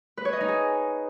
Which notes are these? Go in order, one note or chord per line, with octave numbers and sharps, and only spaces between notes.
B4
C#5
D#5
D#4
G#4